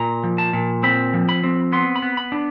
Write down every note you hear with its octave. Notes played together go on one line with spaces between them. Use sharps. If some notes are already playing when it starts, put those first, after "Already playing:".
Already playing: A#2 A#5
F3
A5
A#2
C4 B5
F3
B5
C4
B3 C6
B5
B3
B5
D4